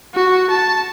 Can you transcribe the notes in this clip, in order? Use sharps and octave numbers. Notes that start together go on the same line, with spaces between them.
F#4
A5